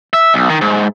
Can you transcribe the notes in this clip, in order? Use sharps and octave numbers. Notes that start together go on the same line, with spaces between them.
E5
B1
D#3
G#2